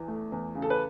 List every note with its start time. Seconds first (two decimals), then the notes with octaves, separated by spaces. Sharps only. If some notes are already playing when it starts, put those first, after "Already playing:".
Already playing: E2 E3
0.08 A3
0.32 E2
0.55 C#3
0.62 A4
0.70 B4